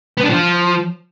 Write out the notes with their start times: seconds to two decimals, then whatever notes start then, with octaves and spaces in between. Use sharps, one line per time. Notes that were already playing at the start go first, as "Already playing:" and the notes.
0.17 B3
0.23 D4
0.29 F3